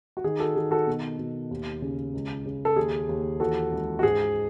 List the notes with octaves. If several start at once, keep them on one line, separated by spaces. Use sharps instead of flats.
F#4
D#3 G#4
F#4 A4
D#3 G#4
F#4 A4
B2
B2
D#2
C#3
C#2
C#3
A4
D#2 G#4
D#2
E3 F#4 A4
C#2
F#4
G#2 G#4